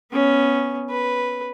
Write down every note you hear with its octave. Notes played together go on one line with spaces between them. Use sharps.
B3 C#4
B4